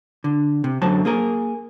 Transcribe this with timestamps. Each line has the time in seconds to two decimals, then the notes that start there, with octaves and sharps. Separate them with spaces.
0.24 D3
0.64 C3
0.82 F#2 D3 F#3 C5 A5
1.05 A#3 G#4 A#4